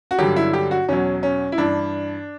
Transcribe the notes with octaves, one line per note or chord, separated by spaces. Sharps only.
F#4
G2 D3 F#3 G4
E4
G4
F#4
E2 B2 F#3 C#4
C#4
E4
G2 E3 D4